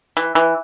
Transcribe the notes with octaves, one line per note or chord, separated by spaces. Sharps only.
E3
E3